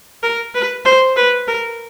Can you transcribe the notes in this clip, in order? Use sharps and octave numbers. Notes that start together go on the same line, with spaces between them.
A#4
B4
C5
B4
A#4